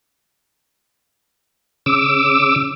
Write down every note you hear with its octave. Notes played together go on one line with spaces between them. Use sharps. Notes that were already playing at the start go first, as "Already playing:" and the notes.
C#3 D6 E6